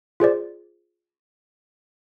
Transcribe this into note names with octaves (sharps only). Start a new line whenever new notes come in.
F4 G#4 C5 D5